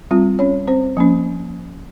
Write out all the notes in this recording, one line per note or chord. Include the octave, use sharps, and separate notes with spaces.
G3 C4 F4
C#4 C#5
C4 C5
F3 A#3 C#4